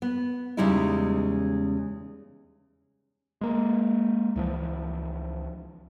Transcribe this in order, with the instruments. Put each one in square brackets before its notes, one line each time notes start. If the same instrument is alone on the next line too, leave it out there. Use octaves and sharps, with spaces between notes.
[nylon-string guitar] B3
E2 C#3 G3 G#3 D#4 E4
[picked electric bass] G#3 A#3
C#2 E3 F3